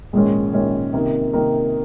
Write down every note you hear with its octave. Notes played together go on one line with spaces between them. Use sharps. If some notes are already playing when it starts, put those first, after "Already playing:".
A#1 G#2 D#3 G#3 C#4
A#1 G#2 D#3 G#3 C#4
C3 D#3 A#3 D#4 A#4
C3 D#3 A#3 D#4 A#4